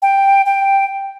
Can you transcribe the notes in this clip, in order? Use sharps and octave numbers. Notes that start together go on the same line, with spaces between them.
G5
G5